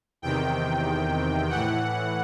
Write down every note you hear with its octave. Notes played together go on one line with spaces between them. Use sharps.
E2 C3 D#3 G5
A2 E3 F#5